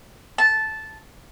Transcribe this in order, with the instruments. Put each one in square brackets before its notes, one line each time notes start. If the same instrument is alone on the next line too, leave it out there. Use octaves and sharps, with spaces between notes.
[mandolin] A5